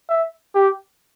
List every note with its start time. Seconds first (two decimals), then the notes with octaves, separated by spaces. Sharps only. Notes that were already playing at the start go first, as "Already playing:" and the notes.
0.09 E5
0.55 G4